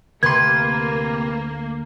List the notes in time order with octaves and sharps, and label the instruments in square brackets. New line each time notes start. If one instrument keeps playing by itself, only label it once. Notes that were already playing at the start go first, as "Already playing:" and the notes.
[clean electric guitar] D2 C6 [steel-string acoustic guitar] C3 B4 [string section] A#3 [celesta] G#6